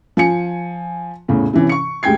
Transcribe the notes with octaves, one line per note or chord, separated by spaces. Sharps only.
F3 G#5 C#7
E2 A2 C#3
C3 E3 C#4
C#6 C#7
D2 G#3 G4 G5 G#6 C7